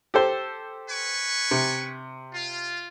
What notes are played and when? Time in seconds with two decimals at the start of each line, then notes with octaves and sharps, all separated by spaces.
0.14 G4 A4 C5
0.89 B4 G#5 C#6
1.51 C3
2.33 F4